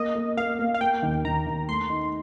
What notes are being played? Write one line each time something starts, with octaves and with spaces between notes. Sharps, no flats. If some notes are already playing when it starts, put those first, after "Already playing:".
Already playing: A#3 D#5
A#3
A#3 F5
A#3
F5
A#3 G5
D#2
D#2 A#5
D#2
A3 C6
D#4